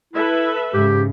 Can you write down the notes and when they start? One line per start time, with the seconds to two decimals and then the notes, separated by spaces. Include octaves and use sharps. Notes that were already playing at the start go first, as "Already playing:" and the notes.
0.13 E4 A4 B4 E5
0.74 G#2 C#3 G4